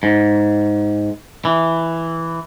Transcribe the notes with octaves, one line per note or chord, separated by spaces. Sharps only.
G#2
E3